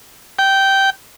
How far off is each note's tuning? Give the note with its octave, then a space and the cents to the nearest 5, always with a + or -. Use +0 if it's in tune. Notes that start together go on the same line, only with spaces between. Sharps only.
G5 -10